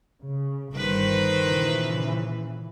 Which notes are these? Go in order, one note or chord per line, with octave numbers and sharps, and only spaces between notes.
C#3
G1 D#3 B4 C5
A#2 C#3 E3